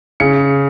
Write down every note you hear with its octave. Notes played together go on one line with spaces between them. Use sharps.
C#3 C#7